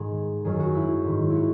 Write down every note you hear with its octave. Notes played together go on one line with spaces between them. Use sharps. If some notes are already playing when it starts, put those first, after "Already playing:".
Already playing: G#2 D#3 G#4
F#2 D#3 G#4
F#4
E4
G#2 D#3
E4 F#4